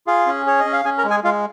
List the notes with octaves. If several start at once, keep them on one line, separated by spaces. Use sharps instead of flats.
F4 G#4 F5
C#4
G#4 C#5
D#5
C#4
F5
C#4 G#4 G#5
A#4 A#5
G#3
G#4 G#5
G#3 F4 F5